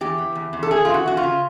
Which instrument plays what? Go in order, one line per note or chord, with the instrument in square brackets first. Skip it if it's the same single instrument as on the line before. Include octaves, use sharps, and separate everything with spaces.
[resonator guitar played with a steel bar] E2 G4
E3
E2
E2
A4
E2 G#4
E3 F4
F#4
E2 F#4
F4
C#3